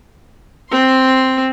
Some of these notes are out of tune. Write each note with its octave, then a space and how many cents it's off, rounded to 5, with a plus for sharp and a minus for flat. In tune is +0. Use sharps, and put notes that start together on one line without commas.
C4 +0 C6 +0